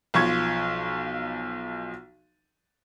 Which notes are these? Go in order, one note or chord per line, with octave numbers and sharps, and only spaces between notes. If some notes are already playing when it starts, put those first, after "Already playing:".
B1 F3 C#6 G#6